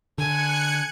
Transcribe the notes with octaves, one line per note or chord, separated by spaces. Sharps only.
D3 G#5 F#6 G#6 C#7